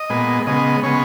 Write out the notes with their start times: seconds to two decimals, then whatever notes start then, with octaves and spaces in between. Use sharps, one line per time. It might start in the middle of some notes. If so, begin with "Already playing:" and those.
Already playing: D#5
0.10 A#2 G#3 B3
0.47 C#3 G#3 B3 D#5
0.83 C#3 G#3 B3 C#5